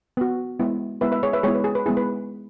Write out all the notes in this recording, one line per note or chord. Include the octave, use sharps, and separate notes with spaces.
B3 F#4
G#3 B3 E4
G#3 B3 E4 B4 E5
B4 E5
G#4 C#5
B4 E5
G#3 B3 E4 G#4 C#5
B4
G#4
B4
G#3 B3 E4 G#4
B4